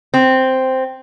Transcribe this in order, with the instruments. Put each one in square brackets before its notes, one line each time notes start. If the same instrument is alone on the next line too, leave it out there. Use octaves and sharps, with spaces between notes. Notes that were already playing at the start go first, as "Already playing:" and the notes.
[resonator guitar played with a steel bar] C4